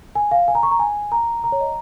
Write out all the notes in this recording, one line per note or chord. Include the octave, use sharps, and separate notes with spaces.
G#5
F5
G#5
A#5
C#6
A#5
G#5
A#5
A#5
C#5
D#5